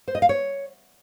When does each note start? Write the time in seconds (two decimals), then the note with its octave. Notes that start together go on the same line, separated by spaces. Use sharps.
0.08 C5
0.15 D#5
0.22 F5
0.29 C#5